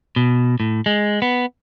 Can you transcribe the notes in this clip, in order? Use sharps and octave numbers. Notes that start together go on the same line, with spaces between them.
B2
A2
G#3
B3